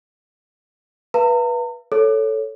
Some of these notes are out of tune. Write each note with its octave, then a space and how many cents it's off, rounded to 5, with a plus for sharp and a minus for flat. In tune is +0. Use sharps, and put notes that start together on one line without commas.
B4 -20 F5 -40 A#5 -40
A4 +0 C#5 +0